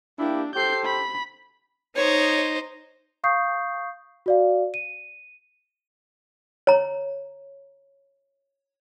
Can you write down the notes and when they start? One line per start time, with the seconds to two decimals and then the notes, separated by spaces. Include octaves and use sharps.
0.19 A#3 D4 E4 G4
0.55 G4 A4 C5 G6 C7
0.85 B5
1.96 D#4 C5 C#5 D#5
3.24 F5 C#6 D#6 G6 C7
4.26 F#4 D5 F5
4.74 D#7
6.67 C#5 A#5